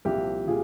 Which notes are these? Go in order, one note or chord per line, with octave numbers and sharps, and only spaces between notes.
C2 A#2 F3 G4
A#2 F3 G#4